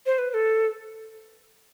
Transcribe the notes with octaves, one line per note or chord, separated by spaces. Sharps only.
C5
B4
B4
A4